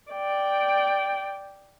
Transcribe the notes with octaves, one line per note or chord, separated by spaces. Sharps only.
D5 G5